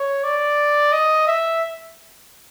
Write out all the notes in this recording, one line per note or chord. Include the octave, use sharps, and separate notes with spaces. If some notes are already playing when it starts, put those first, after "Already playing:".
Already playing: C#5
D5
D#5
E5